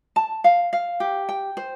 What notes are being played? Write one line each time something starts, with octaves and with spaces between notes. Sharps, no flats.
A5
F5
F5
G4
G5
C5